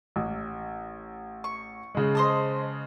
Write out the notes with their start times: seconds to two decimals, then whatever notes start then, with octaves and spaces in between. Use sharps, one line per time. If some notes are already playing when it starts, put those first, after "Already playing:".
0.16 A1
1.44 C#6
1.95 C#3 G#3
2.15 C5 D#5 A5